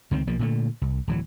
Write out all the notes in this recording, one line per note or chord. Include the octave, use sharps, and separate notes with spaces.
C#2 D#3 G#3 C4
B1 F3 A#3
A#2 D3 A3
C2
D1 E3 F#3